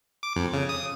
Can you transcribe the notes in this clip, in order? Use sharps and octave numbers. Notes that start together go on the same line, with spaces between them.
D6
F2
C#3
D#6